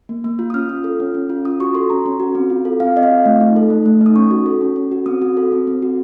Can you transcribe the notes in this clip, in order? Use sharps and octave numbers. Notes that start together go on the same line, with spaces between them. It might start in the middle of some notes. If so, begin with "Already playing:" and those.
A#3
A#3
F4
D#6
C#4 F6
F4
A4
C#4
C#4
F4
C#4 D#6
F#4 C#6
A4 C6
C#4 A#5
C#4
F#4
C4
F4
A4
C4 F5
C4 D#5
F5
F4
A3
D#4
A4
A3
A3
D#4
D#6
C#4 C#6
F#4
A4
C#4
C#4
F#4
C4 D#6
F#4
A4
C4
C4
F#4